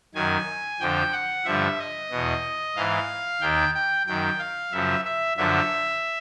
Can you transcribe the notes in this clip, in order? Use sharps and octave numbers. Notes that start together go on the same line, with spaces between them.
F#2 D#3 G#5
F2 D3 F3 G5
F#5
G2 D3 F3 E5
D#5
E2 B2
G#2 E3 F5
D#2 D#3 G5
G5
F#2 D#3 G5
F5
F#2 C#3 F3 E5
E5
F#2 D3 F3 E5